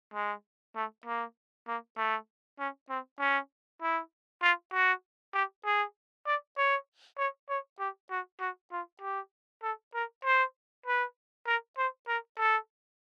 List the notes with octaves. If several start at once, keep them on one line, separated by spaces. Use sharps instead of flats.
G#3
A3
A#3
A#3
A3
C#4
C4
C#4
E4
F4
F#4
G4
G#4
D5
C#5
C#5
C#5
G4
F#4
F#4
F4
G4
A4
A#4
C5
B4
A#4
C5
A#4
A4